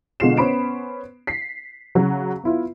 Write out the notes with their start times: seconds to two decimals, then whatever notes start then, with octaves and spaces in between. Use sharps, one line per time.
0.20 B2 D3 G#3 F4 C7 E7
0.37 B3 C#4 C5 B5 D7
1.27 B6 C7
1.95 C#3 F#3
2.44 B3 E4 F4